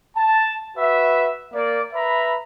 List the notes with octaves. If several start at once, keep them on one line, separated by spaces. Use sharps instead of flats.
A5
F#4 B4 E5
A#3 D5
B4 E5 A#5 B5